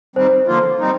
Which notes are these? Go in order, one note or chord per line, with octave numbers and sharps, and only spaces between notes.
D#3 G3 C4 C5
D3 F3 A#3 F4
G3 C4 D#4